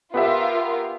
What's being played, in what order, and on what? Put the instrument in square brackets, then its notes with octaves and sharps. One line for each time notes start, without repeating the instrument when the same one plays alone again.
[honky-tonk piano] B3 G4 E5 [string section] F4 A#4